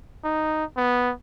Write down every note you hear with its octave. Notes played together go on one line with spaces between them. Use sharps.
D#4
B3